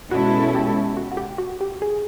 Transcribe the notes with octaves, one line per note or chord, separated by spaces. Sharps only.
B2 G#3 C#4 E4 F#4 A4
G4
F#4
F#4
G4
F#4
G4
G#4